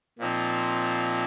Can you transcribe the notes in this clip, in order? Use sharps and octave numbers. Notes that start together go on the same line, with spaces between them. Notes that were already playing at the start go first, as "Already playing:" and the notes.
A#2 F3 C4 D#4